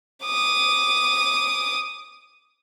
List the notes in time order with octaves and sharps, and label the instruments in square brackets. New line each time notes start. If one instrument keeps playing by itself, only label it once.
[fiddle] D6 D#6